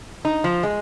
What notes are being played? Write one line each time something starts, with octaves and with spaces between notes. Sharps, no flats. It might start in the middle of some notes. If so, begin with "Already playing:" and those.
D#4
F3
G#3